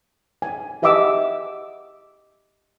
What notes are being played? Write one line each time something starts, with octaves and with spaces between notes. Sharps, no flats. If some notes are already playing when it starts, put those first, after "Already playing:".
G#5
G4 D#5 E5 F#5 D6 E6